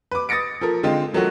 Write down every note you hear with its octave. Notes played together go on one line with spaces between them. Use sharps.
B4 D6
D#6 A6 A#6 C#7 D7
F3 A4 A#4
D3 G#3 C4 F4
F3 F#3 A3 A#3 F#4